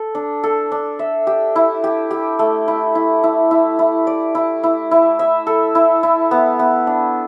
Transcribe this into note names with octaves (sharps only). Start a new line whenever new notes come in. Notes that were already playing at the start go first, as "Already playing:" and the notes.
Already playing: A4
D4
A4
D4
E5
G4
E4
G4
G4
A3
E4
E4
E4
E4
E4
D5
E4
E4
E4
E5
A4
E4
E4
B3
B3
D4